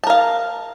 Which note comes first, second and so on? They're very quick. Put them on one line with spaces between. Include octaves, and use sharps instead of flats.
A5 A#4 F5